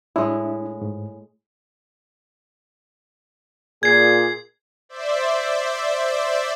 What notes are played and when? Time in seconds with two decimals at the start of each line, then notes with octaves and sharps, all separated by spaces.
0.16 A2 G#3 D4 E4
0.82 G#2
3.83 A#2 G#4 G#6 C7
4.89 C5 D5 E5